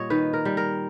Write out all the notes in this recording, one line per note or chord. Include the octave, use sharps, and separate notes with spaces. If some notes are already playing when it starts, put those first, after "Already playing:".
Already playing: A#2 G3 C#5 D#5
D#3 B4
A#4
G3
A#4